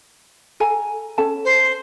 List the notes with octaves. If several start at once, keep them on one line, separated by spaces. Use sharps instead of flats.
A4 G#5 A#5
C#4 A4 A5
C5